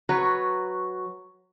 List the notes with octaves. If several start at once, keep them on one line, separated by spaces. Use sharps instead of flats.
F#3 F#4 B4 C#5